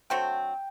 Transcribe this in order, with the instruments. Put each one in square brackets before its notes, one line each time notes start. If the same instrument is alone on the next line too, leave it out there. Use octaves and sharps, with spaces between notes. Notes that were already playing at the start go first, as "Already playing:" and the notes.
[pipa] D3 F#3 A3 C4 [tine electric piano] G5